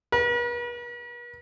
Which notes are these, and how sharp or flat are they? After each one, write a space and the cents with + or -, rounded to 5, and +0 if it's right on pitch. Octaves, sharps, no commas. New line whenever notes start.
B4 -45